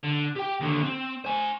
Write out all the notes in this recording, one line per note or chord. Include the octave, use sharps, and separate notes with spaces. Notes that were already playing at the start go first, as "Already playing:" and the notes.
D3
G4 G5
D#2 D3
C4
C5 G#5